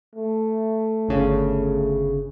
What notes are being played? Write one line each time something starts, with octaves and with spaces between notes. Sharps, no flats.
A3
G1 C#3